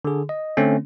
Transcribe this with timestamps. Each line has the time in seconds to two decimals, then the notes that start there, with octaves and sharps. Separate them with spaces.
0.05 D3 G#4
0.29 D#5
0.57 D3 A3 C4 C#4